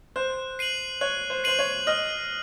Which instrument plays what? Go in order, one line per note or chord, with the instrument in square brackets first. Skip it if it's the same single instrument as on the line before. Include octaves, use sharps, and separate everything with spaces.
[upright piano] C5 [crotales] F#6
[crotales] C7 D#7 F#7
[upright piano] C#5 [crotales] F#6
[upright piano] C5
[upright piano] C5 [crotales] C7 D#7 F#7
[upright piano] C#5
[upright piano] D#5 [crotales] F6